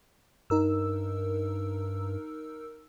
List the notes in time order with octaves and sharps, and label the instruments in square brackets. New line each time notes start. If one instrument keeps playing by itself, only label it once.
[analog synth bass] G2 [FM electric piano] D#4 A#4 E6